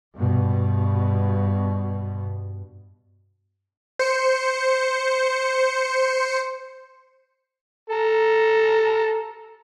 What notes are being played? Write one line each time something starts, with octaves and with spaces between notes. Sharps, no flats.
G2 B2
C5 C#7
A4 A#5